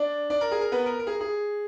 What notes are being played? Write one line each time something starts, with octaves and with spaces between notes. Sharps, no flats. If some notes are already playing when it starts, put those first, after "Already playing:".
Already playing: D4 D5
D4 D5
A#4
G#4
A#4
B3 B4
A#4
A#4
G#4
G#4